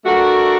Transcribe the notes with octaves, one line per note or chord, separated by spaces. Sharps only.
A3 D4 F#4 A#4